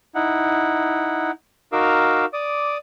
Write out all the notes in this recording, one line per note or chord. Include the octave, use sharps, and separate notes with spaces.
D#4 E4 F#5
D#4 F#4 A#4 F5 D6 E6
D5 D6 D#6